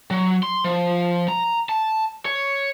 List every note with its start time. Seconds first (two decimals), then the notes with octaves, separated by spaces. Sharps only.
0.11 F#3
0.43 C6
0.64 F3
1.28 A#5
1.69 A5
2.25 C#5